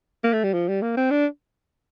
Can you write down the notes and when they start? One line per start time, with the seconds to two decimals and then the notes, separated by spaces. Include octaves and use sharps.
0.24 A#3
0.33 A3
0.44 G3
0.53 F3
0.68 G3
0.82 A#3
0.97 C4
1.11 D4